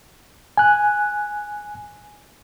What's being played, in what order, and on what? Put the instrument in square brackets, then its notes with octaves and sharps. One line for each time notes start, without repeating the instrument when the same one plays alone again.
[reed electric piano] G#5 F#6